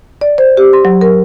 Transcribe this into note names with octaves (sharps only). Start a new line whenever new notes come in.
D5
C5
G4
C6
F#3
A#4